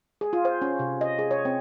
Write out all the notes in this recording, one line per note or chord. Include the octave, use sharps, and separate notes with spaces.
G#4
F4
C5
C#4
C3
D#5
G#4
C#5
C4